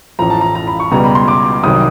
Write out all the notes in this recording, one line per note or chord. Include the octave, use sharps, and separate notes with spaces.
A1 A2 F3 A#5
A5
A#5
A#5
B5
C#6
C#2 B2 G3 A#5
B5
C6
D6
C2 C3 D#3 F#3 D#6